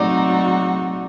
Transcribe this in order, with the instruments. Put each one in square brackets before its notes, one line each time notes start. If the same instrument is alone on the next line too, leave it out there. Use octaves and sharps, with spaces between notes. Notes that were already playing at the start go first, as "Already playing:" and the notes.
Already playing: [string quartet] F#3 A3 C4 D#4 F#4 [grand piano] D5